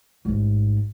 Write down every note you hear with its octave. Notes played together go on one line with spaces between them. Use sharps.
A1 G#2